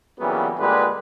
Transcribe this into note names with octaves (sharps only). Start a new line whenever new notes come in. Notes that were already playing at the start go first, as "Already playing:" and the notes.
A#2 C#3 E3 F#3 G3 B3
A#2 D3 G3 G#3 B4